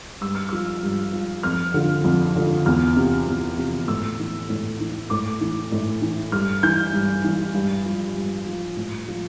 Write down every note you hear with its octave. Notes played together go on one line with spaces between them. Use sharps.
G2 E6
F6
F3 E6
G2
F3
F2 F6
D3 F3
F2
D3 F3
E2 F6
C3 F3
E2
C3 F3
A2 E6
E3
A2
E3
A2 D6
E3
A2
E3
G2 F6
E3 G6
G2
E3
G2
F3
G2
F3
A2
F3